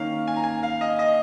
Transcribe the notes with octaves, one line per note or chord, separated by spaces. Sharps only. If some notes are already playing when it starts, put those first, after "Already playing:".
Already playing: D#3 A#3 C#4 F5
G#5
A#5
G#5
F5
D#5
D#5